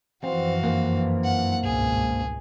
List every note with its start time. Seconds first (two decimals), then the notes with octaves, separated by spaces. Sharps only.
0.24 F#2 E3 F3 C4 F#4 F5
0.63 G2 A#3 C4
1.24 F#5
1.64 G#1 C#2 B2 G#4